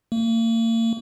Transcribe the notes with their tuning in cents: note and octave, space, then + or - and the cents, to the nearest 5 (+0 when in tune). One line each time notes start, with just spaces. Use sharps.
A#3 -40